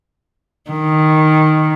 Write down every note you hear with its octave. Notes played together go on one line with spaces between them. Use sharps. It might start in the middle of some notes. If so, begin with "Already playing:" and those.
D#3